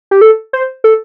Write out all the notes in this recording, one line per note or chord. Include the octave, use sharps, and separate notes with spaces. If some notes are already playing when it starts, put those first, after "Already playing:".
G4
A4
C5
A4